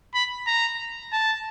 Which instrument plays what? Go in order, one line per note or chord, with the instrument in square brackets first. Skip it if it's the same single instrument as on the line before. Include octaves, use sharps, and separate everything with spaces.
[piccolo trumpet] B5
A#5
A5